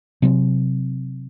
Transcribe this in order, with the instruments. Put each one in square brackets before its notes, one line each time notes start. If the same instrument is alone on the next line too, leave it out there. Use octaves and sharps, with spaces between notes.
[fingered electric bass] C3 F#3 C4